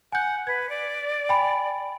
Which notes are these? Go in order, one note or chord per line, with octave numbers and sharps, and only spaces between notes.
F#5 G#5 G6
B4 G#6
D5
G5 G#5 B5